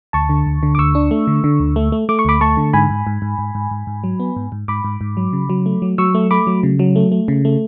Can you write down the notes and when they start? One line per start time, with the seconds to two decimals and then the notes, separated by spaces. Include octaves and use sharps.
0.13 D2 A5 C#6
0.29 D3
0.46 D2
0.63 D3
0.75 D6
0.78 D2 C#6 E6
0.95 D4
1.11 A3
1.27 D3
1.44 D3
1.60 D2
1.76 A3
1.92 A3
2.09 A3 D6
2.19 C#6
2.25 D2 B5 D6
2.41 A3 A5 C#6
2.57 D3
2.73 G#2 G#5 B5
2.90 G#2
3.07 G#2
3.22 G#2
3.39 G#2
3.55 G#2
3.71 G#2
3.87 G#2
4.04 F#3
4.20 B3
4.36 G#2
4.52 G#2
4.68 G#2 B5 D6
4.85 G#2
5.01 G#2
5.17 F#3
5.33 C#3
5.50 F#3
5.66 A3
5.82 F#3
5.98 F#3 C#6 E6
6.15 A3
6.31 A3 B5 D6
6.47 F#3
6.63 C#3
6.79 F#3
6.96 A3
7.12 A3
7.28 C#3
7.45 A3